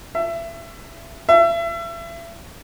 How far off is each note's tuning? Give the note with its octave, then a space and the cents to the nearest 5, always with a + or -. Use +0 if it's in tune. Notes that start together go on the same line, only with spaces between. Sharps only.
E5 +25
E5 +35